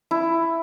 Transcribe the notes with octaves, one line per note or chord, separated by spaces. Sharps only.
E4